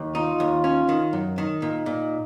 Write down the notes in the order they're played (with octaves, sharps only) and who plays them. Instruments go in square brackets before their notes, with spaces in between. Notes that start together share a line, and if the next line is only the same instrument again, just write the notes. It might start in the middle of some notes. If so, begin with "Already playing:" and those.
Already playing: [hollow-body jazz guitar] D#2
[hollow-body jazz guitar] D#4 [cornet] F4
[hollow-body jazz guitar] D#2
C#4
D#3
F#2
D#3
[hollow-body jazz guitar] A#2 [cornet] D#4
[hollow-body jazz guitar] A#2